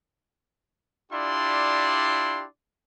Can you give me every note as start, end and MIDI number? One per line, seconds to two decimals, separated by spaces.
1.12 2.45 62
1.12 2.45 64
1.12 2.45 65
1.12 2.45 67
1.12 2.45 74
1.12 2.45 84